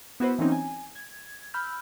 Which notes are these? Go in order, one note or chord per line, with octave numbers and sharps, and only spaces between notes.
B3 E4 F#4 B4 C5
E3 F#3 A#3 C4 C#4 D#4
G#5
G#6
B5 E6 F6 G6